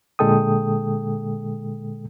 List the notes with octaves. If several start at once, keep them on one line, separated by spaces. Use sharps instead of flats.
A#2 D3 G#3 A4 G5 D#6